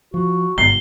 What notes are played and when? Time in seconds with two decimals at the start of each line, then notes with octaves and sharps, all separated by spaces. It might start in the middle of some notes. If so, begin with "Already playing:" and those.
0.14 F3 F#4
0.58 G1 G#2 B2 C7 G7